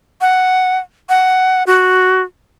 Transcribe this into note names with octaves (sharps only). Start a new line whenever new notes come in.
F#5
F#5
F#4